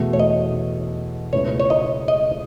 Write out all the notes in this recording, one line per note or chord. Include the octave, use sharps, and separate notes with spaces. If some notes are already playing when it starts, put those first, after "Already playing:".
Already playing: E2 B2 A3
C#5
D#5
C#2 B2 A3 E4 B4 C#5
C#5
D#5
D#5